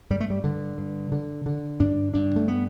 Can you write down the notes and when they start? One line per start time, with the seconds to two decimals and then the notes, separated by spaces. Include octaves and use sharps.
0.10 G2 G3
0.20 A3
0.30 G3
0.44 G2 D3
0.78 G2
1.12 D3
1.46 D3
1.80 G2 D4
2.14 G2 D4
2.36 A3
2.48 B3